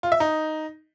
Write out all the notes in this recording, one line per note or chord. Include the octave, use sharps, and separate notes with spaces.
F4
E5
D#4